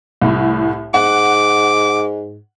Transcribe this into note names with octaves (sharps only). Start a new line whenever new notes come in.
C2 A2
G#2 F#5 D6